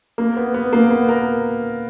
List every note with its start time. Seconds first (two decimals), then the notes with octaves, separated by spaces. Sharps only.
0.18 A#3
0.37 B3
0.54 B3
0.73 A#3
0.91 B3
1.09 A#4